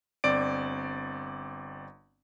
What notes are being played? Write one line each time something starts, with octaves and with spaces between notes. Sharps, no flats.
G1 C4 D5 D7